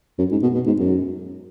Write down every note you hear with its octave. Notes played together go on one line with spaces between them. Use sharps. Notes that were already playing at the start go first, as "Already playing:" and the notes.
F#2
G#2
B2
B2
G#2
F#2